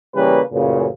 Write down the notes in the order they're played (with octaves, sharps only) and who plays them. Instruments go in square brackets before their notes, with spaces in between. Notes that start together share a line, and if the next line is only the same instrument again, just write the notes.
[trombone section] C#3 E3 G3 A#3 C#4 B4
A1 F#2 A#2 C#3